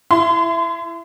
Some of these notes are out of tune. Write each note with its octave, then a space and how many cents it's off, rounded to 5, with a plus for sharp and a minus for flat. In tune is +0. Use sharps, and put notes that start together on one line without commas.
E4 +15 C6 -35